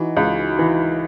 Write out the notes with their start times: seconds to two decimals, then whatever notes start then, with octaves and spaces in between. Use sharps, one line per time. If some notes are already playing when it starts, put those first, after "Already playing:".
Already playing: E3 D#4 F#4
0.17 C#2
0.59 E3